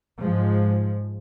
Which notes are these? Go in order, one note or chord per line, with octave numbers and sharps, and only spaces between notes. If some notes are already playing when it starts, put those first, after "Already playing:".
G#2 F3 G#3